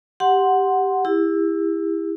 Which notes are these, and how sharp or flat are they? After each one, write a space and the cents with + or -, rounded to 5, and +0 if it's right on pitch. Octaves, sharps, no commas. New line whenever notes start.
G4 +0 F#5 +0 C6 +0
E4 +0 G4 +40